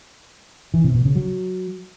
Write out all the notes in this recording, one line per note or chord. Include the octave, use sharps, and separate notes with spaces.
E3
C3
B2
C#3
F#3